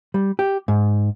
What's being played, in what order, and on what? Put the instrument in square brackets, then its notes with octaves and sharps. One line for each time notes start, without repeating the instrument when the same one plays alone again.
[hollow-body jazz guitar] G3
G4
G#2